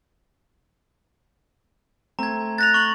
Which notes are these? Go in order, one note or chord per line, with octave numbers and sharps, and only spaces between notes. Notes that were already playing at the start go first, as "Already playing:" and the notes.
A3 C4 A#5 G#6
F#6 A6 A#6 F7
C#6 F#7